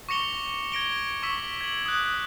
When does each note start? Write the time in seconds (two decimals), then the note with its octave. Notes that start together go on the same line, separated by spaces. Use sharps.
0.09 C#6 D6 A#6 C#7 F7 G7
0.72 G#6 A#6 D7 G7
1.22 C#6 D6 E6 B6 F#7
1.61 G#6 F#7
1.86 D#6 F#6